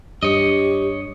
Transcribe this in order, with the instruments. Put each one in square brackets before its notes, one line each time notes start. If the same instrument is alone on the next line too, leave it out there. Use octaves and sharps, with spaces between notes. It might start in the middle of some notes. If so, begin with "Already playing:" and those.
[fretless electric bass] G2 [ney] G4 [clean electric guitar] C#5 D#5